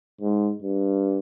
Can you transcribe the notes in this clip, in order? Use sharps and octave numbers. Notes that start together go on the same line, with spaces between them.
G#2
G2